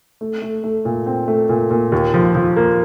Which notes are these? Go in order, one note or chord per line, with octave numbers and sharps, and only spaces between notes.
A3
A3
A3
A#2
C4
A3
A#2
A#2
D#2
F3
F3
A#3